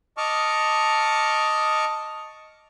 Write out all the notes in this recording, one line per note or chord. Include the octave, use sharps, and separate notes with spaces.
D#5 A5 C#6 D6 F6